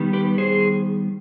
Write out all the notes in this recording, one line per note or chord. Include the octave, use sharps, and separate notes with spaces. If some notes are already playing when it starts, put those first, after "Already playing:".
Already playing: D#3 G3 B3
G4 B4
G#4 C5